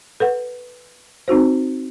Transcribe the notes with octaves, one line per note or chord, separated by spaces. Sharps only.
A4 B4 F#5
C4 D#4 F#4 C5